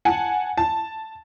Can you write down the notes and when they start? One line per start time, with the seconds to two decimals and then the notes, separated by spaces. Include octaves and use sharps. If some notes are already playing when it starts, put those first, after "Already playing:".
0.05 F#5 G#5 A5
0.58 A5